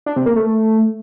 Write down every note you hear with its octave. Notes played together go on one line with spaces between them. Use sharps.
D4
C3
A#3
A3